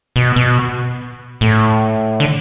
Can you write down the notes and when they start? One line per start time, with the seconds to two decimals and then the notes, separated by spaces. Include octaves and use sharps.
0.16 B2
0.36 B2
1.41 A2
2.20 D3